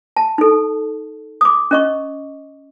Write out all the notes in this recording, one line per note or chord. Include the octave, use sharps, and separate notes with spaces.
A5
D#4 A4
D6 D#6
C#4 D#5 C#6